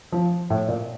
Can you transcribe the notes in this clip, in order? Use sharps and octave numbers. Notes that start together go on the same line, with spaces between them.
F3
A2
A#2